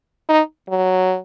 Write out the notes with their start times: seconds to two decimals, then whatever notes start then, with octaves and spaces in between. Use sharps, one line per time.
0.29 D#4
0.69 F#3